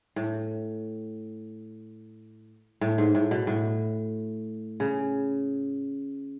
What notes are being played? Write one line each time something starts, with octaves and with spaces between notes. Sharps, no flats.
A2
A2
G#2
A2
B2
A2
C#3